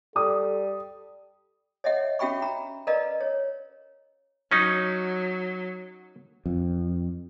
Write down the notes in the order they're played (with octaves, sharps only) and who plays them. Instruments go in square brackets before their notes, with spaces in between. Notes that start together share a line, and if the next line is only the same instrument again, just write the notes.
[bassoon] G3 [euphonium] A4 [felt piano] D#6
[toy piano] C#5 D#5 E5 F#5
C#4 F#4 E5 G5 B5 C#6
A#5 B5
A#4 B4 D5 D#5 F5 A#5
C#5
[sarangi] F#3 [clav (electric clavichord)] C#4 D#4
[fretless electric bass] F2